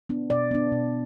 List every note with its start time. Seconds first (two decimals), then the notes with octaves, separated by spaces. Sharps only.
0.09 B3 D4
0.30 B2 D5
0.51 B3 D4
0.72 B2